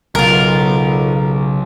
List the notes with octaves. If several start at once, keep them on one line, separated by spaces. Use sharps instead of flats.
B1 C#3 F4 A#4